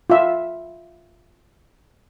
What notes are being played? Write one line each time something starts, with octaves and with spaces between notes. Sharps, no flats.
F4 E5